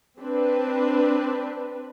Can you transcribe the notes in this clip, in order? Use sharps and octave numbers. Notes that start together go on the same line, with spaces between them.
C4 D4 B4